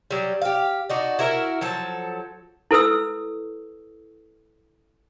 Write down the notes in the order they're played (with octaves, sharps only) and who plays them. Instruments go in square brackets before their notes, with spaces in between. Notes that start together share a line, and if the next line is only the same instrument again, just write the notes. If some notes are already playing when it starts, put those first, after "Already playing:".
[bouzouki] F#3 G3
G4 F5
D4 D#4 F#4
E4 F#4 A#4 E5
F3 F#3 A4
[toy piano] E4 A4 B4 D#6 E6